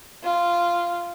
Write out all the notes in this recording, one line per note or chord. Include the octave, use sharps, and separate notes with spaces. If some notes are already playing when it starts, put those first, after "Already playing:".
F4